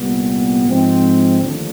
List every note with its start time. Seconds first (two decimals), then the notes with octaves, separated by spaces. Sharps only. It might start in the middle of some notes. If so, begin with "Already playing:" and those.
Already playing: C2 A#2 G3 B3
0.65 G#2 F3 G#3 C4
1.41 D#2 D3 F3 A3 D4